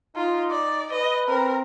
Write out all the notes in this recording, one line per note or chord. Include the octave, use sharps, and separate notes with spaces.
D#4 F4
D5
B4 D#5
C4 A#4